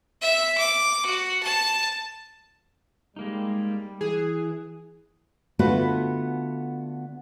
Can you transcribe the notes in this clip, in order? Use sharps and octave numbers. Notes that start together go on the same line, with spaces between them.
E5
D6
F#4
A5
G3 G#3 A#3 D#4
E3 G#4
D3 A3 B3 F4 F#4 B4